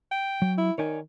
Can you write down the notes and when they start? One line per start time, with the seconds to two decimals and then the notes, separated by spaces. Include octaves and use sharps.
0.12 G5
0.42 F#3
0.58 E4
0.78 D#3 C#5 D5 G#5